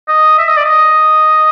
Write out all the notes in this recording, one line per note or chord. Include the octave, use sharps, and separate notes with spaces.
D#5
E5
D#5
D5
D#5